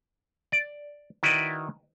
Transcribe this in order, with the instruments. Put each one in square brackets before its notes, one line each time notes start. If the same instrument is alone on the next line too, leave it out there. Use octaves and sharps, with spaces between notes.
[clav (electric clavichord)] D5
D#3 E4 F#4 B4 D5 D#5